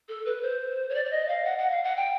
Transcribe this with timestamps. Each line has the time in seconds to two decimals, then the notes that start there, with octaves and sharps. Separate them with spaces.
0.09 A4
0.26 B4
0.42 C5
0.89 C#5
0.95 D5
1.05 D5
1.11 D#5
1.28 F5
1.45 F#5
1.58 F#5
1.71 F5
1.84 F#5
1.97 G5